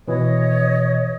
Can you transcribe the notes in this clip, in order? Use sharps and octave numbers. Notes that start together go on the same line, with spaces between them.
B2 E3 C#5 D#5 D#6